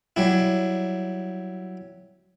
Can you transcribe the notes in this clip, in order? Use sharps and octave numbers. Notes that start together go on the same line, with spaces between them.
F#3 G3 E4